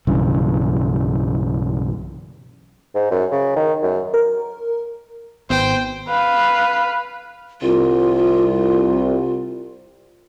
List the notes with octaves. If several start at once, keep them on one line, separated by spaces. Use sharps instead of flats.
B1 G2 C#3 E3
G#2
F#2
C#3
D#3
F#2
A#4
G#1 B3 C5 G5
B4 F5
C2 F4